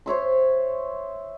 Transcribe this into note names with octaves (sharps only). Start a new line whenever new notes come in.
C5 C#5 E5 C6